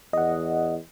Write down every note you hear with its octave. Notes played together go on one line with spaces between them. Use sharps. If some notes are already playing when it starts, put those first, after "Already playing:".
E2 D#5 F#5